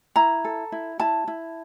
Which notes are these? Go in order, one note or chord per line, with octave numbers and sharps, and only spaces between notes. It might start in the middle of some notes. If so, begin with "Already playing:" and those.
E4 A#5
A4
E4
E4 A5
E4